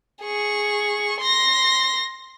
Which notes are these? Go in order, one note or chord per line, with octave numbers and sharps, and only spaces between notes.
G#4 C#6
C6 A#6